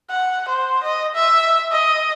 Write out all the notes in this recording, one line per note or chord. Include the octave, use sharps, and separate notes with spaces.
F#5
C5
D#5
E5
D#5